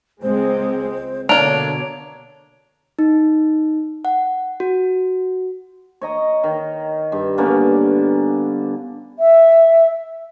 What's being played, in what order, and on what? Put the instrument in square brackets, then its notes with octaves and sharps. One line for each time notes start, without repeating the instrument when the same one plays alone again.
[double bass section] C#2 G#3 C4 [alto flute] C5
[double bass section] B2 D3 [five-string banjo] A#3 D4 [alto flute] C#5 [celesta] A#5 D7 F7
[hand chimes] D#4
F#5
F#4
[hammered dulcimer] C#5 D#5 A#5
D#3
G2
D3 A#3 B3 C#4
[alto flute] E5